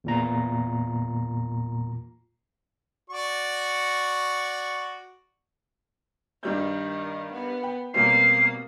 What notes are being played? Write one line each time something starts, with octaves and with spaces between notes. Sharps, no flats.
E2 A#2 A#5
F#4 D5 C#6
G2 D#3 G3 G6
B3
G5
B2 G3 A#3 C4 C7